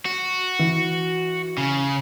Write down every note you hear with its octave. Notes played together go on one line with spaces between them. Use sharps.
F#4
E3
C#3